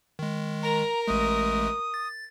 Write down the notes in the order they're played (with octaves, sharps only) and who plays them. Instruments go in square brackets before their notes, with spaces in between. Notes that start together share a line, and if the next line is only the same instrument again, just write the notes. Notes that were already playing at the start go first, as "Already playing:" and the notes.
[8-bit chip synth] D#3 G#3
[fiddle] A#4 [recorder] A#5
[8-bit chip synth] A1 G#3 A3 [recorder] D#6
[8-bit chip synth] A6